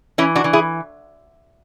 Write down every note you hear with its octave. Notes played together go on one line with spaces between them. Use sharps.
E3 C#4 E4
D4 F#4
E3
E4 G#4